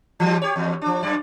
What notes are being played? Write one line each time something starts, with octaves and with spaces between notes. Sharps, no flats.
E3 G3
G4 C#5
E2
F3 D4
F#2 D5